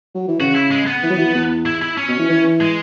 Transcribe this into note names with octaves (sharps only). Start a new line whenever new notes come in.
F#3
E3
C#3 F#4
E4
G#3
B3
E3
F#3
E3
E2
E4
E4
C#4
B2
E3
E3
G#3